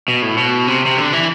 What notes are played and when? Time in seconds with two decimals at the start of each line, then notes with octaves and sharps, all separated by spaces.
0.08 B2
0.22 A2
0.37 B2
0.67 C3
0.86 C3
0.97 D3
1.13 E3